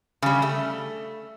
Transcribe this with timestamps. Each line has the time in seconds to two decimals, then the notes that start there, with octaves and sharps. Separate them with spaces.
0.22 C#3 G3
0.42 A3